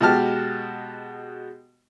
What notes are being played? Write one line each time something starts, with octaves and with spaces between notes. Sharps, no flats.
B2 G#3 F#4 G4 A5 F6